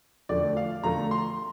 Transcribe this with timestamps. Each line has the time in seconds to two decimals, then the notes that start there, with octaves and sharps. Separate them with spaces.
0.29 F2 D3 F3 A3 D5
0.57 F5
0.83 F2 D3 F3 A3 A#5
1.11 C6